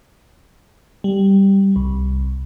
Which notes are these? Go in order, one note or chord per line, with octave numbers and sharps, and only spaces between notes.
G3
C2